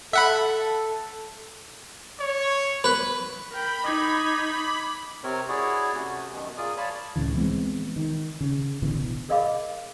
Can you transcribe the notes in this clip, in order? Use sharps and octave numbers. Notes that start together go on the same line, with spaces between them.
A4 E5 F#5 B5
C#5
B4
A#4 G5 B5
D#4 D6 G#6
C3 C4 A#4 C#5
E4 F#4 G#4 C#5 D5
C3 A3 C#4 F#4
F#2 B2 D#3
F4 G#4 A#4 D5 D#6
C#5 D5 F5 A5 B5
C#2 A2 C#3 E3
E3 G#3 B3 C4
D#3
C#3
A1 B2 D3 E3
G#4 A#4 D#5 F5 B5 D6